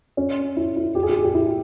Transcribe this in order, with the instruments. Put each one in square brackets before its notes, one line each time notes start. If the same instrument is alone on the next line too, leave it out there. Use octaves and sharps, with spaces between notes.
[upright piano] C#4
E4
E4
G4
G#4
G4
G#4
G4
E4